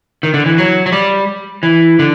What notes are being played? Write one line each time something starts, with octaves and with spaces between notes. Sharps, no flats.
D#3
D3
E3
F#3
F#3
G3
E3
D3